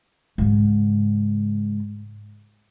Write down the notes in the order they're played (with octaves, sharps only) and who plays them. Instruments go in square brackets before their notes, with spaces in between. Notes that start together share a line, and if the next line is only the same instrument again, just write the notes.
[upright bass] G#2 C#3